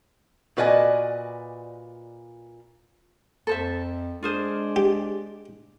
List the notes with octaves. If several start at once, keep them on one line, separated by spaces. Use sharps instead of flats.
A#2 F#4 B4 D5 D#5 G#5
F2 A4 C5 E5
G#3 D4 F4 G#4 C5
G4